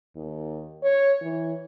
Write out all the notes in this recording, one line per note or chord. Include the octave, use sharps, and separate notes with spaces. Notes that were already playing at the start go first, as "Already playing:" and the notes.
D#2
C#5
E3